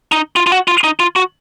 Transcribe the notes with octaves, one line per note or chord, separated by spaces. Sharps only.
D#4
F4
F4
F#4
F4
D#4
F4
F#4